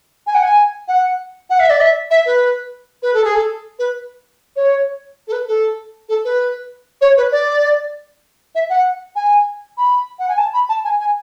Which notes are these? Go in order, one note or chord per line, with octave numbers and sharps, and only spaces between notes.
G#5
F#5
G#5
F#5
F#5
E5
D5
E5
E5
B4
B4
A4
G#4
A4
B4
C#5
A4
B4
A4
A4
B4
C#5
B4
D5
E5
F#5
G#5
B5
F#5
G#5
A5
B5
A5
G#5
G#5